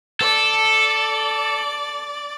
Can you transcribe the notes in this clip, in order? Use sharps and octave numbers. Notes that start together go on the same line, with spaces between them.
A4 D5